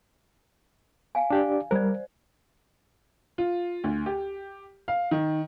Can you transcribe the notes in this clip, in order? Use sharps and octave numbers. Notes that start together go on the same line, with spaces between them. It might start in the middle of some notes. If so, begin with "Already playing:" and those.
F5 G#5
D4 G4 D5
G3 A#4 C5 D5
F4
D2
G4
F5
D#3